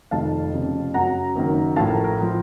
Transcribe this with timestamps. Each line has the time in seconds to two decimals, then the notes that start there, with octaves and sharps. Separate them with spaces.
0.11 F1 F2 D#3 A3 F5 A5
0.53 F1 F2 C#3
0.94 F#2 C#3 F#3 F#5 A#5
1.35 F#1 F#2 D#3 A#3
1.76 A1 A2 F3 A3 F5 A5
1.90 A#4
2.04 A#4
2.20 A2 F3